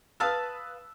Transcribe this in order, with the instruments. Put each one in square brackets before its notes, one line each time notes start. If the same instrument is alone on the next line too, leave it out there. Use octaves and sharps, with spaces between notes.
[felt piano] B4 D#6 E6 [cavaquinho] F5 A5 B5